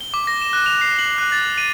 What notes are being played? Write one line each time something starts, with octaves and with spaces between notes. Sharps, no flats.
G7
D6
A#6
E7
F#6
F7
C7
F#7
F#6
A6
D#7